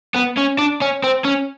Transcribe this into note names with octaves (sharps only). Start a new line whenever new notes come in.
B3
C#4
D4
C#4
C4
C#4